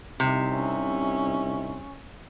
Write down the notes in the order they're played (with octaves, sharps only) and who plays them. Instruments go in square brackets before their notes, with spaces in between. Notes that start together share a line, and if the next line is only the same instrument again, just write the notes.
[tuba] C2 [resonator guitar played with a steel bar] C3 [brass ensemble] D#4 E5
[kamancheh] C#4